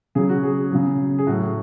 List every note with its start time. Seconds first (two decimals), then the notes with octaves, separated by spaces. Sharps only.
0.15 C#3 F#3 G#4
0.29 F#4
0.43 G#4
0.72 C#3 F#3
1.19 G#4
1.27 A2 F#3 F#4